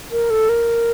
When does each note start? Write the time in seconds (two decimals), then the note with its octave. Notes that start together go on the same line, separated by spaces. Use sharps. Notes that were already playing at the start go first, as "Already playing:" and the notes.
0.12 A#4
0.30 A4
0.49 A#4